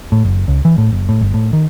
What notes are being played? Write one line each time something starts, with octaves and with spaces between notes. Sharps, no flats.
A2
F#1
C#2
E3
A2
F#1
A2
G1
A2
D#3